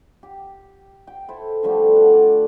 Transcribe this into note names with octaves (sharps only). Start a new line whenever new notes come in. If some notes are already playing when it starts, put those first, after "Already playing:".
G4
G5
E4 A4 C5
D3 F3 G3 A3
F#5
D5